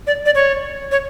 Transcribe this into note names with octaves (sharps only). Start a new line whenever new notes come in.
D5
D5
C#5
C#5